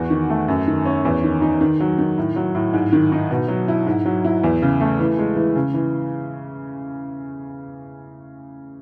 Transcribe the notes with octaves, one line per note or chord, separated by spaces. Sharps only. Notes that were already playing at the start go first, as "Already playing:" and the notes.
Already playing: E2 F#4
D#3
A3
F#2
D#3
C#4
E2
D#3
D#4
D#3
F#3
D#3
A2
F#3
A2
G#2
D#3
D#4
B2
F#3
E4
G#2
F#3
E4
E2
C#3
A3
E3
G#3
E3
C#3
E3